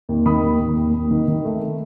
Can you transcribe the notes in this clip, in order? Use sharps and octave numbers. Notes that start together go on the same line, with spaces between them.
D#2
D#3 B5 D#6
D#2
D#2
D#2
D#2
D#3
D#3
A3
A3